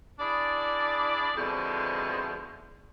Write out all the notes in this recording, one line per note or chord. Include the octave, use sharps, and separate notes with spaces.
D4 E4 G#4 D5
F2 B2 D3 G#3 E4 C5